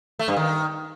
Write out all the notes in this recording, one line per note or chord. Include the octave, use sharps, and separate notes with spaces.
A3
G2
D#3